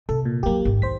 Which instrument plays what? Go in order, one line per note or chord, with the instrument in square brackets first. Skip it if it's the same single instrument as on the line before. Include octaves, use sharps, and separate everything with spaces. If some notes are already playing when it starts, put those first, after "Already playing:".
[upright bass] C3 [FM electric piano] A4
[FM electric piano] A#2
[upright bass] F2 F#3 [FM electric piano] A#3 G4
[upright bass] G#1 F#2
[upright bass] D#2 [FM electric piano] C5 B6